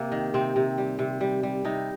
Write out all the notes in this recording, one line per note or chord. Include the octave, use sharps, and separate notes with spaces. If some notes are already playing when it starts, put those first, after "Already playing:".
Already playing: C3 A#3
D#3
C3 C4
C3
G3
C3
G3
G3
C3 D#4